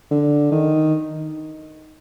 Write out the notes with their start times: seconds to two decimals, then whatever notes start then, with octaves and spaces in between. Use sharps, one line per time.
0.11 D3
0.52 D#3